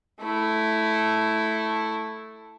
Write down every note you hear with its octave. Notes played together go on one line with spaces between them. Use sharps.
A3 E4